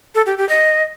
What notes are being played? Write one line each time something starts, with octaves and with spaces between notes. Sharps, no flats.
A4
G4
G4
D#5